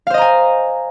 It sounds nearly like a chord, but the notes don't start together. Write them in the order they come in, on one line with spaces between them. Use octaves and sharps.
F5 C5 D#5 A#5 G#5